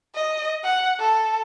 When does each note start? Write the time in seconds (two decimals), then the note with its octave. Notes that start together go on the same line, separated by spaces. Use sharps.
0.15 D#5
0.64 F#5
0.99 A4